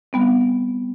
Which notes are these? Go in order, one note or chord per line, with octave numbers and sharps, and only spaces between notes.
G3 B3 C4